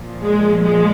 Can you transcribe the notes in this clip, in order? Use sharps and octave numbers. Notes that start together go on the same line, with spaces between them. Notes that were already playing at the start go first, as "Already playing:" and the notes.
Already playing: A#2 F3
G#3
G#3